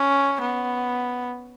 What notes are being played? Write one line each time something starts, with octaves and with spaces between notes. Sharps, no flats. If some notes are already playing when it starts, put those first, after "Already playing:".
Already playing: C#4
B3